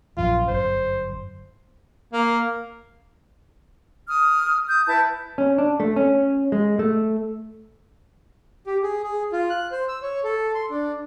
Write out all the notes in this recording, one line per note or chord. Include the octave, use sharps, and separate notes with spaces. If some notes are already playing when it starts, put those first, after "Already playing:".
A#1 F#2 F4
G1 F#2 C5
A#3
D#6 F6
D#6 G6
E4 B4 A5 G6
C#4
D4
A3
C#4
G#3
A3
G4
G#4
G#4
F4
F#6
C5
E6
C#5
A4
C6
D4